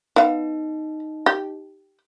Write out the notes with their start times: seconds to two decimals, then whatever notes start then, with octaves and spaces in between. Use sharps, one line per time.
0.16 B3 D#4 F5
1.26 G4